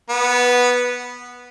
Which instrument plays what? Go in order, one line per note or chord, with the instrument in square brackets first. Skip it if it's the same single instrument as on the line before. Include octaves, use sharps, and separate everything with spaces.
[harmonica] B3